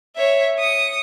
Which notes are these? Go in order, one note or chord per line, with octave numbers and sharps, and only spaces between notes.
C#5 E5
D#6 C#7